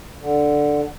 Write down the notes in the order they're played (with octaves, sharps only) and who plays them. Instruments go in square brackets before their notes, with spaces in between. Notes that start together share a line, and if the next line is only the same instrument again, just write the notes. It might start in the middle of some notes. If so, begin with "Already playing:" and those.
[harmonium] D3